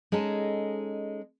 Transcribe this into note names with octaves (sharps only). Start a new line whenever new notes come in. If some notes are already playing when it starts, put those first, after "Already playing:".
G#3 C#4 D#4 A4